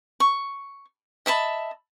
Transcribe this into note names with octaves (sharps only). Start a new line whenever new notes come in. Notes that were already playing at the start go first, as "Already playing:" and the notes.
C#6
D#5 E5 A5 B5